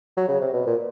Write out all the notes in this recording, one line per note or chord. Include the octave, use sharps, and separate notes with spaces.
F#3
C#3
C3
B2
A#2